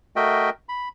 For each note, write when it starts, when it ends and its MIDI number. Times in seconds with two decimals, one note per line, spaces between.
0.16 0.50 57
0.16 0.50 66
0.16 0.50 70
0.16 0.50 75
0.16 0.50 76
0.16 0.50 79
0.69 0.89 83